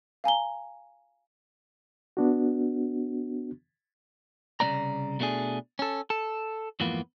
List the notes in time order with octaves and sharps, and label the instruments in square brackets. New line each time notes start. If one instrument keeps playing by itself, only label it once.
[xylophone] F5 G#5 A#5 G7
[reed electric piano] B3 D4 F#4
[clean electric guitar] C2 C#3 F3 C4 D5 A#5
B2 A3 D4 G#4
C#4 A4
A4
F2 G#2 E3 A#3 B3 F4